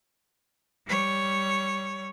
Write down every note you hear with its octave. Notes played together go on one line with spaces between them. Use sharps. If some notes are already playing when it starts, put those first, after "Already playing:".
G3 C#5